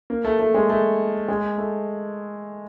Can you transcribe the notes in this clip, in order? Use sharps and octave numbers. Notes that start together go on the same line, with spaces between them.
A#3
A3
A3
G#3
A3
G#3
A3